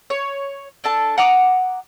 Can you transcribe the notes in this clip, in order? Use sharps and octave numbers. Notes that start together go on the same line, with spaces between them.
C#5
D4 A4 A5
F#5 A#5 D6 D#6